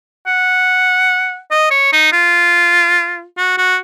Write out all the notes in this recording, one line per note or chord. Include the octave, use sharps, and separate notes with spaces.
F#5
D#5
C#5
D#4
F4
F#4
F#4